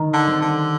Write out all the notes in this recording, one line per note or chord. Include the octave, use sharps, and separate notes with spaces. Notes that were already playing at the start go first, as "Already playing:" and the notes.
Already playing: D#3
D3
G3 C4
D3